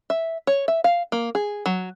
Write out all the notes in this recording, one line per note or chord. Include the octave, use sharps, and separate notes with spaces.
E5
C#5
E5
F5
A#3
G#4
F#3